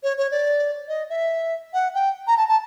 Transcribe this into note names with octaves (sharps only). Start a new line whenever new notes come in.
C#5
C#5
D5
D#5
E5
F#5
G5
A#5
A5
A5